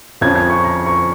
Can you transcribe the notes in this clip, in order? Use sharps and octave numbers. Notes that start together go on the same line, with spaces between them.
F2 F3 C#4 F4 G#6
G#6
C#6
A#5
C#6